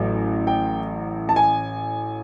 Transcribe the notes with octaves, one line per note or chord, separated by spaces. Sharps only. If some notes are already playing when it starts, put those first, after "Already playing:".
Already playing: A1 A2 F#3
G5
A5
G#5